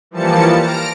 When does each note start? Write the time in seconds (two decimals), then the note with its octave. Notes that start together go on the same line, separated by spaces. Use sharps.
0.11 E3 F3 G3 A#3 A5 C#7
0.61 F6 A#6 D7